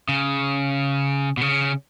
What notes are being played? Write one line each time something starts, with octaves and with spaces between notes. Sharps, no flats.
C#3
B2
C#3